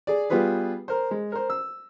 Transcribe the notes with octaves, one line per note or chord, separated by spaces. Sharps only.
G#4 D5
G3 B3 F4 G#4 B4
A#4 C5
G#3
A#4 C5
E6